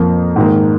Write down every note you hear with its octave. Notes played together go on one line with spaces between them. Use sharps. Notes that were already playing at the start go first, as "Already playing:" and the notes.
Already playing: F2 F3 A#3
G#2 D#3 A#3